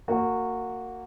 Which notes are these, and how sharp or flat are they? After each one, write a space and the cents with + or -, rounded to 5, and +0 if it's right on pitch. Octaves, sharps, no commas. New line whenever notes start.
A#3 -25 F#4 -10